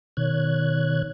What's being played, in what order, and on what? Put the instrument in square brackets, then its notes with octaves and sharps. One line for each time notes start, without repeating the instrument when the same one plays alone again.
[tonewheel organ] B2 D#3 C#5 F#6 G#6